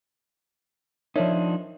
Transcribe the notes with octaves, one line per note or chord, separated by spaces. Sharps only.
F3 D4 D#4 A#4 C#5 E5